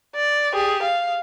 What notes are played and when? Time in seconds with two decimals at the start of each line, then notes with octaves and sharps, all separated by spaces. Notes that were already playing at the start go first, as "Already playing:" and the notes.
0.15 D5
0.53 G4 G#4
0.83 F5